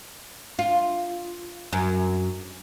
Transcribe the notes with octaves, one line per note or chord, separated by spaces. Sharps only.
F4
F#2